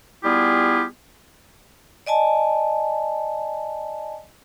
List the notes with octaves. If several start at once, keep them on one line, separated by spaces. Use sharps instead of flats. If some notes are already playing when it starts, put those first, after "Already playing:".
G3 B3 E4 F4 G4 G#4
D5 D#5 G#5 A5